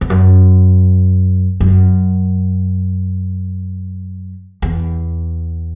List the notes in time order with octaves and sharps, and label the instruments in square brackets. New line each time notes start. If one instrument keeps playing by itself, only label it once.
[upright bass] E2
F#2
F#2
E2